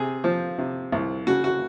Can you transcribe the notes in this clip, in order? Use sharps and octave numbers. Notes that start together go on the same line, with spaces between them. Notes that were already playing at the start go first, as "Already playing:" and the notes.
Already playing: C3 G#4
F3
C3
C2
C#3 F#4
F#4